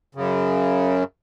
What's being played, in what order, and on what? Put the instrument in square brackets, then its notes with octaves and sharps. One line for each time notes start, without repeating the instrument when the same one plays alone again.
[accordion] F#2 C#3